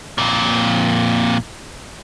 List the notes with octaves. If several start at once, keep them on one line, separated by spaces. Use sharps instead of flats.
F2 A#2